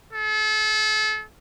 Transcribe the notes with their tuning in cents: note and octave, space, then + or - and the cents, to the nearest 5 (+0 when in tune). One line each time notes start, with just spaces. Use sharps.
A4 -35